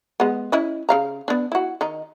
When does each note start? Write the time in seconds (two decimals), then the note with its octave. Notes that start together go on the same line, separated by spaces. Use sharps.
0.20 G#3 B3
0.52 C#4 E4 D#5
0.89 C#3 F5 A#5
1.28 B3 D4
1.52 E4 F#4
1.81 D#3 D#4